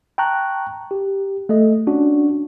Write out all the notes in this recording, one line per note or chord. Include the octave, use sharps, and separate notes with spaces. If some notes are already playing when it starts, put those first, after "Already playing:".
G5 A5 A#5 C#6 F#6
G4
A3 A4 D#5
C#4 D4 F#4